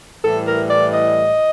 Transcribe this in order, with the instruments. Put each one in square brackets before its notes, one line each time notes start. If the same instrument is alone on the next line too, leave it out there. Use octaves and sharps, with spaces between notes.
[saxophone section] A2 E3 G3 A4
A#4
D5
D#5